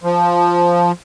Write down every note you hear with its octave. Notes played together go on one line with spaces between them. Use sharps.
F3